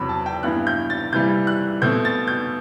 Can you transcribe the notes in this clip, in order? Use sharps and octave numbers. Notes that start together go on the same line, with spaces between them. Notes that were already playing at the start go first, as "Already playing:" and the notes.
Already playing: E2 C3 F#3 C4 B5
A5
G5
G2 E3 B3 F#6
G6
A6
C3 E3 G3 G6
F#6
B2 A3 C4 G6
A6
G6